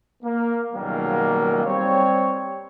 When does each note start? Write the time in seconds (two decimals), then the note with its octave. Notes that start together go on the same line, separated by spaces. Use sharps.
0.23 A#3
0.73 C#2 B2 D#3 F#3 G3 A#3
1.65 G3 C4 C#5